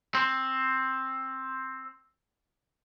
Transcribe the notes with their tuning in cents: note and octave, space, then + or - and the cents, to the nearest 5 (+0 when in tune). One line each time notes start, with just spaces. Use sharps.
C4 +10